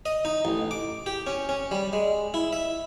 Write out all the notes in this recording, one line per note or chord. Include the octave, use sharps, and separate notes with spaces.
D#5
D#4
A1
D6
G4
C#4
C#4
G3
G#3
E4
E5